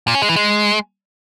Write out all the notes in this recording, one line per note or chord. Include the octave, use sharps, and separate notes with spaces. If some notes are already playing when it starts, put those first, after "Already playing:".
A#2
C#4
G#3
E3
G#3